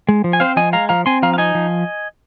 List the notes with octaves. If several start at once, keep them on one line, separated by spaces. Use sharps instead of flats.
G#3
F3
G#5
C4 C5 F5
F3 D#5 G#5
G#3 F5 A#5
F3 F5 A#5
C4 G#5 C6
F3 F5 A#5
F5
D#4 D#5 G#5
F3